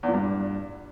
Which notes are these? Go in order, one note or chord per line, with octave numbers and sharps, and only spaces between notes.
E2
A#2
G2